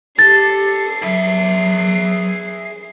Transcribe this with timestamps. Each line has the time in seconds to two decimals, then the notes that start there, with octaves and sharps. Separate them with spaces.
0.19 G4 A4 A6 C7
1.03 F#3 G#4 E5